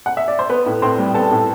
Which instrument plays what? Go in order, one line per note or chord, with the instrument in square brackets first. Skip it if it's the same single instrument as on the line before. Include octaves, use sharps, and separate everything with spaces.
[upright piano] F#5
E5
D5
C5
B3 B4
A2
A2 C4 C5
G3
B3 A4 A5
A2